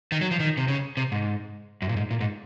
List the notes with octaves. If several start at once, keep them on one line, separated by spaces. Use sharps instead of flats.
D#3
F#3
F3
D#3
C3
C#3
C3
G#2
F#2
A#2
G#2
A#2
G#2